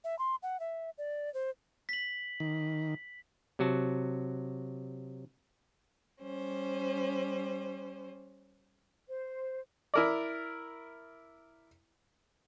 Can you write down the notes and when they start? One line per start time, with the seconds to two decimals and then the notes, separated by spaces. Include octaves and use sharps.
0.04 E5
0.19 C6
0.43 F#5
0.60 E5
0.98 D5
1.34 C5
1.89 B6 F#7
2.40 D#3
3.59 C3 F#3 F#4 A5
6.22 G3 C#4 C5
9.09 C5
9.94 E4 A#4 D5